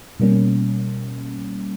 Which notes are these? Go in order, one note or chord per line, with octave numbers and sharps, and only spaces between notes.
B2 G3 A#3 C#4